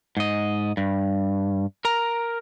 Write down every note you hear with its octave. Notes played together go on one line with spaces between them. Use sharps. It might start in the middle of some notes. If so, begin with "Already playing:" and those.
G#2 D#5
G2
A#4 A#5